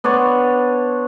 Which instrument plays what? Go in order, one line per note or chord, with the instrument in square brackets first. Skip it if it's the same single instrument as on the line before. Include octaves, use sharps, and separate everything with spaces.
[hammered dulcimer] B3 D4 C5 C#5